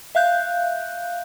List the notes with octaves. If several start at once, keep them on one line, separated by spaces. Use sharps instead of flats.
E5 F5 F#6 G6